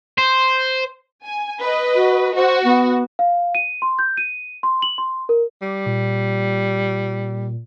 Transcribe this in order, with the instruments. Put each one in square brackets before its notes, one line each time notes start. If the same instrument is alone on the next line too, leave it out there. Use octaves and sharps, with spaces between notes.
[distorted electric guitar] C5
[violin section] G#5
B4 D#5
[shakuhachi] F#4
[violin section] F#4 [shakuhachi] C5
[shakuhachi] B3
[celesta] F5
D#7
C6
G6
D#7
C6
F#7
C6
A#4
[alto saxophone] G3 [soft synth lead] D6
[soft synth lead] A#2